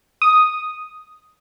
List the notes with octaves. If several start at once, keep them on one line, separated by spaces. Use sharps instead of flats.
D#6